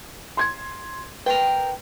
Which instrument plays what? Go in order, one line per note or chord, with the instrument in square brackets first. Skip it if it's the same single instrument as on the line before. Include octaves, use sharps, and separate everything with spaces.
[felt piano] C6 G#6
[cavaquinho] A#4 G5 [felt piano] B4